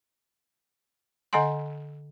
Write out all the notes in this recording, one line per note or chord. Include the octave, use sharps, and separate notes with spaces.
D3 D#5 F#5 G#5 C6